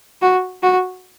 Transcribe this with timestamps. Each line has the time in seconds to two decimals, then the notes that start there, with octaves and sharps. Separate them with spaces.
0.22 F#4
0.62 F#4